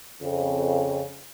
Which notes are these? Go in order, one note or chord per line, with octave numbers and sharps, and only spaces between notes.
F2 C#3